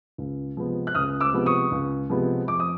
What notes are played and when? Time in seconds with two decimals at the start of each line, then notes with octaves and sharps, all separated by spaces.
0.18 C#2
0.56 C3 F3 G#3 B3
0.87 F#6
0.95 C#2 D#6 F6
1.21 D6 E6
1.33 C3 F3 G#3 B3
1.46 C#6 D#6
1.71 C#2
2.10 C3 F3 G#3 B3
2.48 F2 D6
2.60 D#6